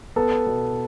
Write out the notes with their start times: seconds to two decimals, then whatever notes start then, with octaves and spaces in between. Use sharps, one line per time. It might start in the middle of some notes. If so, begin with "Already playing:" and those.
0.16 B3 A4
0.47 B2